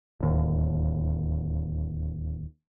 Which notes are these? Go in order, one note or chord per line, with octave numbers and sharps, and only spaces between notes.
D1 D#2